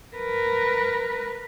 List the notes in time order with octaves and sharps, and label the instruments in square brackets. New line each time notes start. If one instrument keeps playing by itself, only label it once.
[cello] A#4 B4